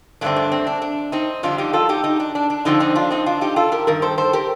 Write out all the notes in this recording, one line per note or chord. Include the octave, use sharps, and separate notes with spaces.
G2 D3 A3 C4 D4
D4
C4
D4
D4
C4 D#4
F2 D3 G3 D4 F4
D#4 G4
F4 A4
D#4 G4
D#4 G4
D4
D4
D4
F2 D3 F3 C4 D#4
C4 D#4
D4 F4
C4 D#4
D4 F4
D#4 G4
F4 A4
G4 A#4
G2 D#3 A#4
A4 C5
A4 C5
G4 A#4